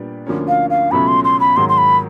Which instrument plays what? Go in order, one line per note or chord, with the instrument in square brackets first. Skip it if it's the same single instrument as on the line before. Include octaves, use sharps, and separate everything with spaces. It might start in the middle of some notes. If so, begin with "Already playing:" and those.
Already playing: [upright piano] A#2 G3 B3 D4
D2 D3 F3 A#3 C#4
[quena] F5
F5
[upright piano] C#2 B2 F#3 A3 C#4 [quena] B5
[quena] C6
C6
B5
[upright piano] G#2 D#3 F#3 A#3 [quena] C6
[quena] C6
B5